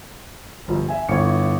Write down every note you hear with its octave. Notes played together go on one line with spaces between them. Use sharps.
G1 F3
E5 G#5
G1 E4 C#5 C#7